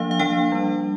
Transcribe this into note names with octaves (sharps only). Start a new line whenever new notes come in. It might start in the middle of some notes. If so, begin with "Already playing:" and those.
Already playing: F3 A#3 D4 F5
F5
F3 A#3 D4 G5
G3 D4